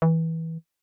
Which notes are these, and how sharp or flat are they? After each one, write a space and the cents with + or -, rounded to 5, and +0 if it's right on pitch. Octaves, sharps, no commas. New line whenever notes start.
E3 -20